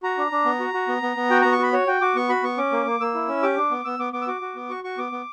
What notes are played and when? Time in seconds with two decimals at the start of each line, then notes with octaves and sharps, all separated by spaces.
0.03 F#4 A#5
0.18 D4
0.31 D4
0.45 B3
0.60 F#4
0.74 F#4
0.88 B3
1.02 B3
1.16 B3
1.30 F#4 G5
1.41 B3 A#5
1.51 C#6
1.59 F#4 B5
1.73 F#4 C#5
1.87 F#4 G5
2.01 F#4 D6
2.15 B3 C#6
2.29 F#4 B5
2.43 B3 C#6
2.58 C#4 D6
2.72 A#3
2.86 A#3
3.00 A#3 E6
3.14 E4
3.28 C#4
3.42 G4 D6
3.57 D4
3.71 B3
3.85 B3 E6
3.99 B3 D6
4.13 B3 D6
4.21 E6
4.27 F#4 D6
4.41 F#4
4.56 B3
4.70 F#4 C#6
4.84 F#4 C#6
4.98 B3 D6
5.12 B3